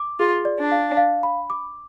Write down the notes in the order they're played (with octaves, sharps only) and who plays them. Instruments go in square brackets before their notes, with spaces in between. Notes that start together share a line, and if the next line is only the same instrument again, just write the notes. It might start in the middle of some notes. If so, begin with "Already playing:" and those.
Already playing: [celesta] D6
[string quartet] F4 [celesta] G#4
[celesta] D5
[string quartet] D4
[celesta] F5
F5
B5
D6